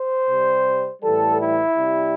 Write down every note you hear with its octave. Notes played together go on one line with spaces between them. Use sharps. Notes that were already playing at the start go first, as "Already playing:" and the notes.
Already playing: C5
C3 G3
A2 E3 G3 A4
E4
C3 G3